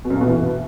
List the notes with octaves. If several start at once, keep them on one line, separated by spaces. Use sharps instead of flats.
B2
F#2
A#2
B2
E3